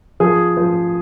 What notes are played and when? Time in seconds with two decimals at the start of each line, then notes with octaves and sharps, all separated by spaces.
0.20 F3 G#4
0.57 F3